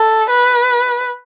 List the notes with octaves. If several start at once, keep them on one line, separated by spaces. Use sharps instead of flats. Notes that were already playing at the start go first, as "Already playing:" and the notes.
Already playing: A4
B4